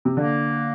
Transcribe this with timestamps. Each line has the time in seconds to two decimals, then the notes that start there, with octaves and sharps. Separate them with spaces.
0.05 C3
0.16 D3 A#3